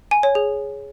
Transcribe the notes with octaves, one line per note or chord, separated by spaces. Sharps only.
G#5
C#5
G#4